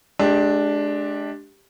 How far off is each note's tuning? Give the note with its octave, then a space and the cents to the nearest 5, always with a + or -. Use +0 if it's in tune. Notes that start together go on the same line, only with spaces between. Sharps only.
G#3 +35 D4 +0 G4 +0